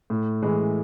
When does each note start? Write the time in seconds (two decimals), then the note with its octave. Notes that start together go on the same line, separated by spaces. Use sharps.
0.10 A2
0.43 E3 G#3